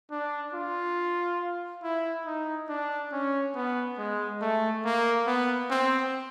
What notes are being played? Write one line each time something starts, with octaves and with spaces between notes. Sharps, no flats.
D4
F4
E4
D#4
D4
C#4
B3
G#3
A3
A#3
B3
C4